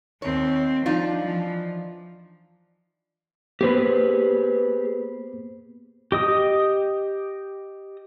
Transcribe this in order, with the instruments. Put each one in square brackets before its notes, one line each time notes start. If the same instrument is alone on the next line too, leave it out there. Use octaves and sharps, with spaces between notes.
[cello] D#2 C4 [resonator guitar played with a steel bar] C#5
[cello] F3 [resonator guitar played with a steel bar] D4 D#4 F4
[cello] E3 F3
[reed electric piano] A#3 B3 C5 [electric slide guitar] G4 G#4 B4
[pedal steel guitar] G4 D#5 D#6